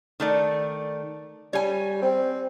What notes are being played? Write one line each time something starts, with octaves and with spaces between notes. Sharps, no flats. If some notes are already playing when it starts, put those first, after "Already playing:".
D#3 A3 D5
G3 C#5 G#5
C4